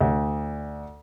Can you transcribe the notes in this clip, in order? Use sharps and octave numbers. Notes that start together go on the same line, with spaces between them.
D2